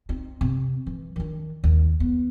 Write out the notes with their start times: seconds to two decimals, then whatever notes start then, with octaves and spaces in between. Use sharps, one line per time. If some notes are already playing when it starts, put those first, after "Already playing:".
0.09 C4 D#4
0.41 C3
0.87 E3
1.16 D#3 D4
1.64 D#2
2.00 B3